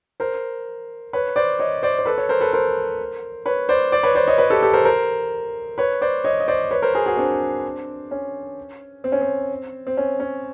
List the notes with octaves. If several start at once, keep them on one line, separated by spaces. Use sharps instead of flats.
A#4 C5
B4 C#5
C5 D5
C#5 D#5
C5 D5
C5
A4 B4
C#5
A#4 C5
A4 B4
A#4 C5
B4 C#5
C5 D5
C5 D5
B4 C#5
C5 D5
C#5 D#5
B4 C#5
G4 A4
G4 A4
A#4 C5
A#4 C5
B4 C#5
C5 D5
C#5 D#5
D#5
C5 D5
B4 C#5
A#4 C5
G#4 A#4
F#4 G#4
C4 D4
C#4
C4
C#4
C4
C4
C#4
C#4